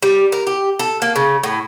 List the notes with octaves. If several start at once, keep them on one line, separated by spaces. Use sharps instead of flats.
G3
A#4
G4
A4
A#3
C#3
A2